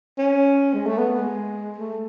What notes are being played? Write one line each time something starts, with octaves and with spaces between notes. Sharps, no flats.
C#4
G#3
A3
B3
G#3
A3